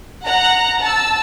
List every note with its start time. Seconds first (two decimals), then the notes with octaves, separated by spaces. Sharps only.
0.23 F#5 A#5 F#6
0.79 A5 E6